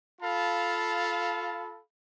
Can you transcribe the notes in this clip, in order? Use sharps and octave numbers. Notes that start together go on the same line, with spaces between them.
F4 A4 F5 A5 B5